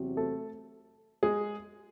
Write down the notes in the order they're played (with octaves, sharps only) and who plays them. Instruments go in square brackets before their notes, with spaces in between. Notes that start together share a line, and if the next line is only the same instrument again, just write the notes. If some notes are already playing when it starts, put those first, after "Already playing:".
Already playing: [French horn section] E2 C3 F#3 C4 F#4
[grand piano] A3 A4
G#3 G#4